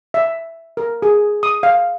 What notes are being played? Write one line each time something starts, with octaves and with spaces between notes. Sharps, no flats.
E5
A#4
G#4
D#6
F5